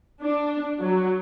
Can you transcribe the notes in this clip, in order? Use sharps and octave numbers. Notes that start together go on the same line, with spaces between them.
D4
F#3